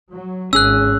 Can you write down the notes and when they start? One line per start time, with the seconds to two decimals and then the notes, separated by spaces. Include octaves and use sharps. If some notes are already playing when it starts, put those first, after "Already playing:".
0.11 F#3
0.53 G#1 C#4 G#4 E6 F#6